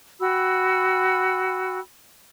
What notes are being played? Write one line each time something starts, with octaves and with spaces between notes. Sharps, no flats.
F#4 G5 B5 E6